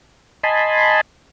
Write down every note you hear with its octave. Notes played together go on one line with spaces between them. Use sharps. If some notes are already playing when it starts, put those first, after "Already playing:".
D#5 G#5 A5 B5 C6